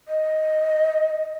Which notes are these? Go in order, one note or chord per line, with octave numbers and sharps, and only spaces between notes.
D#5